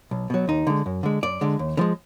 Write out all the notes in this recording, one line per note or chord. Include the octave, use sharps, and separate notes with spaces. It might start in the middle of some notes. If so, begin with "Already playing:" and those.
B1
B2 F#3
D#2 D#4
D3 G#3
F#2
D3 G#3
F#2 D5
D3 G#3
D#2
D3 F3 G#3